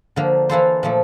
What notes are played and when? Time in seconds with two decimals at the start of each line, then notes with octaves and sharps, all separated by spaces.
0.16 D3 F3 A#3
0.49 E3 A#3 E4 A4 C5
0.83 A#2 F3 A3